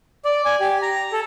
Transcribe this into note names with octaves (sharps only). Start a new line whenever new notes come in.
D5
G#5
G4
A#5
A4